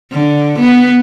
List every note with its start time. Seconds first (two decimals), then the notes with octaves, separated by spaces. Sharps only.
0.13 D3
0.59 B3